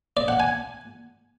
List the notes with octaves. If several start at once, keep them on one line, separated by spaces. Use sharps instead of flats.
D5
F#5
G#5